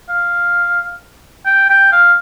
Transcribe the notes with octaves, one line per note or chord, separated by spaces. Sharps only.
F5
G5
G5
F5